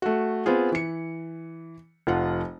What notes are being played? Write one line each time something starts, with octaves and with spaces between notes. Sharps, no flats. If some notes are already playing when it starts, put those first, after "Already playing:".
A3 F#4
B3 C4 F4 G#4
E3 C#7
F1 F3 F4 F#5